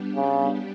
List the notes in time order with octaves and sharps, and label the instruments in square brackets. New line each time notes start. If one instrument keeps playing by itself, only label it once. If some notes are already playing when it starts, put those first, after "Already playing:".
Already playing: [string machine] G3 B3 D4 G4
[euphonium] C#3